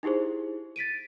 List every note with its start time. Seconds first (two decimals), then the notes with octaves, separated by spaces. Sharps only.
0.03 D#4 E4 G4 G#4 C5
0.76 A6 B6 D7 D#7